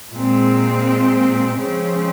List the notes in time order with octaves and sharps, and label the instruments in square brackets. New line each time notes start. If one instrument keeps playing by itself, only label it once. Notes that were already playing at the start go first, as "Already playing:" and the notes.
[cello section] A#2 G#3 C4
C#3 F3 G#3 C4